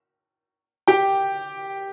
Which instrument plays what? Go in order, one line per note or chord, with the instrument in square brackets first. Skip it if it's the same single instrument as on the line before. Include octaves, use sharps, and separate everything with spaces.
[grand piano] G4 G5